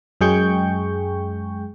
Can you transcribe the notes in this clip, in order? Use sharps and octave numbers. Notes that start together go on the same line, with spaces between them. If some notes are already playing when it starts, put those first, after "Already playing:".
F#2 G#3 G#4 G5 C#6 G6